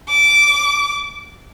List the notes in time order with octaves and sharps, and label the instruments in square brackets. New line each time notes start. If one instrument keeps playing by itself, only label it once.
[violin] D6